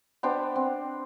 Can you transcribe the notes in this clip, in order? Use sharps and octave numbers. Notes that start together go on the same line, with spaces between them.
B3 D4 C5 G5
C4